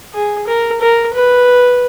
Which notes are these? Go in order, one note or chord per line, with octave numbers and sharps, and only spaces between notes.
G#4
A#4
A#4
B4